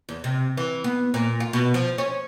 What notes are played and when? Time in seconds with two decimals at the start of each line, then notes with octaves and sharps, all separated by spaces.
0.09 E2
0.24 C3
0.57 E3
0.84 B3
1.14 A#2
1.40 F4
1.53 B2
1.74 F3
1.98 C#4